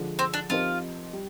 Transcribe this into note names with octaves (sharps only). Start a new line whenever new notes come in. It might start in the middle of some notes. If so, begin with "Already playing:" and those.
Already playing: D3 F3 G#3
C4
D4
F3 C4 D#4 F4 G4 A#4
G3